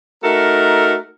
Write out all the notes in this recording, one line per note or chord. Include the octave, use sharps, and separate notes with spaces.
A3 D#4 F#4 A4 A#4